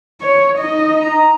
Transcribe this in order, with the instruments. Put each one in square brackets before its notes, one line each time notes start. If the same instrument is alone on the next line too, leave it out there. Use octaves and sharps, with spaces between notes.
[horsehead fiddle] C#5
D#4 D#5
[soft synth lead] A#5